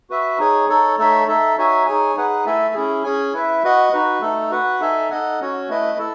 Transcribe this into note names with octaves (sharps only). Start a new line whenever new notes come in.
F#4 B4 E5
D#4 G#4 C#5
D#4 A4 C#5
A3 D#4 A4 C#5 E5
D#4 A4 E5
D#4 F#4 C#5 E5 G#5
D#4 G#4 C#5 G#5
D#4 G#4 B4 F#5
A3 E4 A4 E5 G#5
C#4 E4 G#4
C#4 G#4 C#5 G#5
E4 B4 E5
F#4 B4 D#5 F#5
D#4 F#4 B4
A3 D#4 A4
F#4 B4 F#5
D#4 A4 E5 G#5
D#4 A4 D#5 F#5
C#4 F#4 C#5
A3 E4 B4 D#5
E4 A4